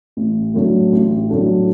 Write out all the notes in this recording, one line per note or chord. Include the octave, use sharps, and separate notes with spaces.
A1
A2 F#3 A3 D4
A1
A2 F#3 A3 D4